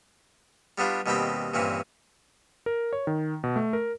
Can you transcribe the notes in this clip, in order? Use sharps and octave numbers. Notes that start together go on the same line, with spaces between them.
G3 B3 D4 F4 G4
D#2 B2 G3 C4 G5 B5
G2 A#2 E3 C4 C#4
A#4
C#5
D#3
B2
A3
A#4